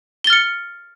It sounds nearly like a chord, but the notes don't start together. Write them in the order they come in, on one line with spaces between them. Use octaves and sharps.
G7 A6 F6 C#7